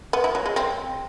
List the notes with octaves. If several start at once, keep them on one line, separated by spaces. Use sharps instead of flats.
B3
E4
F#3
G#3
C4